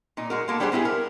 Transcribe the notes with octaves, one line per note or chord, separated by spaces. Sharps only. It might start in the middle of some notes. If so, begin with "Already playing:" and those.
A#2 D#4
G#3 F#4 A#4
G#3 A#3 A4
G3 D4 G4 G#4 C5 F#5
G#3 B3 E4 G4 G#4
A#4